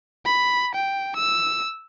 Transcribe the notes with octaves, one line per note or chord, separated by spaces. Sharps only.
B5
G5
E6